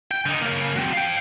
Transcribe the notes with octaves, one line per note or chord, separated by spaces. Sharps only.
G5
D3 D#4
C#3 A#3
F#3 C4
F5 G5